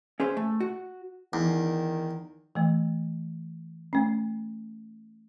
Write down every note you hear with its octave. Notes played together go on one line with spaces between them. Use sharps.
C#4 G#4 B4 C5
A3
F#4
E2 D#3
E3 A3
A3 C#4